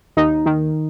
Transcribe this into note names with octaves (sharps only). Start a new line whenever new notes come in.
D#2 D#4
D#3